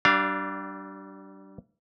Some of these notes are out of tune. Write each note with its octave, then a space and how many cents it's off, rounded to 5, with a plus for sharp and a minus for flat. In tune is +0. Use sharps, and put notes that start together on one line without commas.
G3 -30 D4 +0 F5 +0